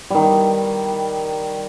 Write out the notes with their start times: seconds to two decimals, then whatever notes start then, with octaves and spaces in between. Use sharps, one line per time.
0.11 D#3 G3